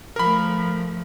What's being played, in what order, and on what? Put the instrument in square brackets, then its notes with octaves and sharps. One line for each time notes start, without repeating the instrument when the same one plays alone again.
[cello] F3 A3 [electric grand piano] A#4 B5